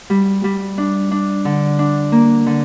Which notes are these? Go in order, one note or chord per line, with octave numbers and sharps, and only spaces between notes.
G3
G3
D4
D4
D3
D4
A#3
D3